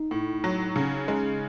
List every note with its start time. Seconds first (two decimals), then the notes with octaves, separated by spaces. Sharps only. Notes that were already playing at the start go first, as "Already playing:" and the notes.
Already playing: D#4
0.11 A2
0.44 F#3
0.76 C#3
1.08 G#3